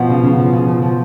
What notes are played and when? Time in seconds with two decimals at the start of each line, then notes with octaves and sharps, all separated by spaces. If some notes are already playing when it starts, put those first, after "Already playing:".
Already playing: B2 F3 B3
0.10 C#3
0.23 C#3
0.39 F3
0.53 C#3
0.68 F3
0.82 F3